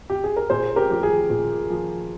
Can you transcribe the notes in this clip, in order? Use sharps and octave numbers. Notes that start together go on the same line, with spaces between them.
G4
G#4
A#4
A#2 G#4 C5
G4 A#4
F3 G4
G#4
A#2
F3